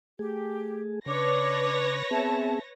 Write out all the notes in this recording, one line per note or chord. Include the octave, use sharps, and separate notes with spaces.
A3 G4 G#4
C#3 D4 B4 C#5 D6 A#6
B3 C4 G#4 E5 A5